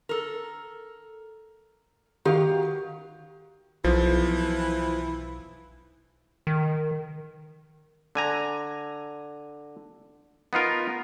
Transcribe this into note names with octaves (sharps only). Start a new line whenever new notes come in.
A4 A#4
D#3 F#4 G4 F5
B1 E3 F3
D#3
D3 G#5 A#5
B3 D#4 F4 A#4